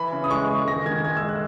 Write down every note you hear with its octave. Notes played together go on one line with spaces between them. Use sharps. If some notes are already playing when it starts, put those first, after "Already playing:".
Already playing: E3 B5
C#3
D#6
G#3 C#6
G#3
D#3 A#6
D#3 G#6
G#3 G#6
E6
G#3
F#6